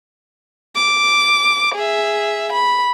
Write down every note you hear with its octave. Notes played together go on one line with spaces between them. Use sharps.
D6
G#4 E5
B5